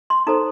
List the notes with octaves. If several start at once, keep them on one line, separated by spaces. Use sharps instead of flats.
C6
D#4 A4 C5 A#5